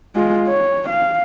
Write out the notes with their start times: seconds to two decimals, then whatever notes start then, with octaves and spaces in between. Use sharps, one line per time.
0.16 G#3 F4
0.48 C#5
0.89 F5